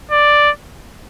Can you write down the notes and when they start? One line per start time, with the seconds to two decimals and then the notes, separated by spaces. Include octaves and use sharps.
0.11 D5